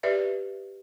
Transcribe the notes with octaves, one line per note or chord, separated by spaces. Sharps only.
G4 B4 D5 E5